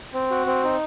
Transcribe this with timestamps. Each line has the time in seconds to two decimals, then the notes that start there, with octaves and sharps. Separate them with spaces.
0.13 C4
0.31 F#4
0.46 C4
0.64 D#4